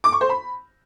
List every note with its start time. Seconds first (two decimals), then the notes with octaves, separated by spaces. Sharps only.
0.04 D6
0.12 C#6
0.21 C5
0.29 B5